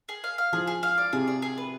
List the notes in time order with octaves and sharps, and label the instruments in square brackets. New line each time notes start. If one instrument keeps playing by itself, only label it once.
[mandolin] G#4
F5
F5
[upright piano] F3 [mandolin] G#4
[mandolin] G#4
F5
D5
[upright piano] C3 [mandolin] G#4
[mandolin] D5
G#4
B4